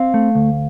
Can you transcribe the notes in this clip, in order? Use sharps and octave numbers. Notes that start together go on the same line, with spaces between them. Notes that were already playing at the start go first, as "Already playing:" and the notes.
Already playing: C4 F5
A3
D2